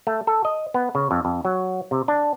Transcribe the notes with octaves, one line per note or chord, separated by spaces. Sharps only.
A3
A4
D#5
B3
C#3
F2
F2
F#3
C3
D4